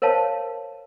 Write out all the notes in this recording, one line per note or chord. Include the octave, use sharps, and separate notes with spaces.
A#4 C5 C#5 F5 A5